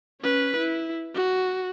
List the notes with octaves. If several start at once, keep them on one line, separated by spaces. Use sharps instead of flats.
C#4 B4
E4
F#4